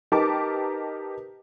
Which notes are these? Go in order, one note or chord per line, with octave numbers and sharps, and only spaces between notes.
D#4 G4 A#4 B4 A5 D6